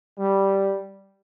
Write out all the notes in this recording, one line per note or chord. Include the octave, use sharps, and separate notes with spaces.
G3